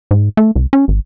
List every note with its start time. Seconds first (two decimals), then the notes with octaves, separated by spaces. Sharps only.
0.11 G#2
0.37 A3
0.56 C2
0.73 C#4
0.88 G#1